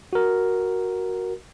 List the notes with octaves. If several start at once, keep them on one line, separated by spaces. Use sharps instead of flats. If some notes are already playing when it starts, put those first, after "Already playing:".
F#4 A#4